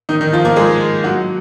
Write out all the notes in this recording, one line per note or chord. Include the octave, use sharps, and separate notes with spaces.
D#3 D#4
D#3 D#4
F3 F4
A#3 A#4
G#3 G#4
F#3 F#4